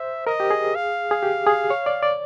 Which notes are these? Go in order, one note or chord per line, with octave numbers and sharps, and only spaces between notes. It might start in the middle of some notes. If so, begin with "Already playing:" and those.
Already playing: C5 E5
A#4 D#5
G4
G#4
F5
G#4
G4
G#4
C#5
D5
D5